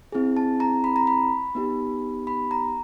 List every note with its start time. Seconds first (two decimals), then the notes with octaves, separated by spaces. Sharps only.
0.12 C4 E4 G#4
0.37 A5
0.60 A#5
0.84 B5
0.96 A#5
1.07 B5
1.55 B3 D#4 G4
2.27 B5
2.51 A#5